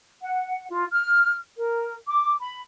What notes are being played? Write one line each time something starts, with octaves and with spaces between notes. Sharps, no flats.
F#5
F4
F6
A#4
D6
B5